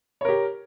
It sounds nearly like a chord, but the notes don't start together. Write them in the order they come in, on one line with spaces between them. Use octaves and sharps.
C#5 A#4 G4